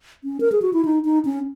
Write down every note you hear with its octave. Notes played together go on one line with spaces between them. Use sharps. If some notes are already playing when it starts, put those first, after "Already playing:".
C#4
A#4
G#4
F#4
E4
D#4
D#4
C#4